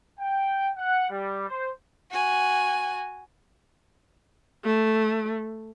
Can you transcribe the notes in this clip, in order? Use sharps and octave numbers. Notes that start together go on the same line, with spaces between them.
G5
F#5
G3
C5
F#4 G#5
A3